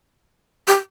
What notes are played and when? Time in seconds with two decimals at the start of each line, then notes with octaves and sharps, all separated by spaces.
0.67 G4